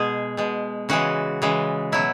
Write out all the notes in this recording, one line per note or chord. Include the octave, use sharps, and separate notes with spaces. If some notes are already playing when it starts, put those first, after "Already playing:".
Already playing: B2 G#3 G#4
B2 G#3
C#3 E3 G#3 F#4
C#3 E3 G#3
B2 F#3 E4